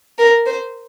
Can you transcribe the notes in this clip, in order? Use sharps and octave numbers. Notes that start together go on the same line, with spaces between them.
A#4
C5